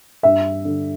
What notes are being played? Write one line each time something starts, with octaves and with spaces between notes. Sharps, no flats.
G2 E5
D3